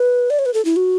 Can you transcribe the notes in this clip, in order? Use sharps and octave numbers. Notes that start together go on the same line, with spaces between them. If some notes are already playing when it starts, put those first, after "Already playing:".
Already playing: B4
D5
C#5
B4
A4
E4
F#4